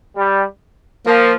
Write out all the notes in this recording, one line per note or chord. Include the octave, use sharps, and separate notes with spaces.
G3
F3 A#3